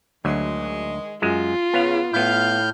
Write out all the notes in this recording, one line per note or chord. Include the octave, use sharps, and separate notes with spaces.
D2 D#3 F#3 G#3
F#2 G#3 F4
C#3 B3 F5
A2 B3 E4 F5 F6 G6